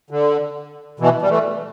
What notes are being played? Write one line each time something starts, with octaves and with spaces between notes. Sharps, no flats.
D3
B2 E3
G3
E3 A3